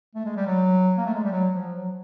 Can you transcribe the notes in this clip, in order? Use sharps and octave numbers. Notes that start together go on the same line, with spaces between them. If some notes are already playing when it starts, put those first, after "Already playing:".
A3
G#3
G3
F#3
A#3
A3
G#3
G3
F#3
F3
F#3